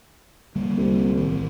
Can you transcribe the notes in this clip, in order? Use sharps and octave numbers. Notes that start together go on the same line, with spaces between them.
D3 G3 A#3
C2
A1 D#3